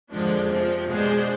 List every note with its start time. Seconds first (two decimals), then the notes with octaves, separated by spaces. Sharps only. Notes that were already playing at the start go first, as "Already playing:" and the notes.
0.11 F2 D3 F3 G#3 D4
0.49 C3 F3 C4
0.89 B2 G#3 D4 G#4 C5